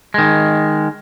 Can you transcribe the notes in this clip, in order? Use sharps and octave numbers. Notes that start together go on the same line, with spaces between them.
D#3 G#3